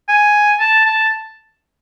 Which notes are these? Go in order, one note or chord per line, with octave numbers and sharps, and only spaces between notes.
G#5
A5
A5